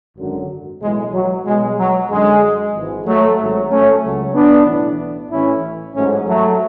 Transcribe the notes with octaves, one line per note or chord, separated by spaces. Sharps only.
G#1 F#2 D3 F#3
B1 A2 E3 G#3
F#3
B1 B2 F#3 G#3
F#3
F#2 D3 F#3 G#3
G#1 G#2 E3
F#3 A3
G#1 G#2 F#3
A3 C#4
C#2 C#3 F#3
B3 D4
B1 A2 E3
A1 A2 E3 C#4 E4
A1 G#2 F#3 A3 C#4
F#3 A3